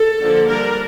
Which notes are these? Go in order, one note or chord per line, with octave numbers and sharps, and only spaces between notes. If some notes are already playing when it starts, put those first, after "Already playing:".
Already playing: A4
D3 F3 A#3 D4
G3 D4 A#4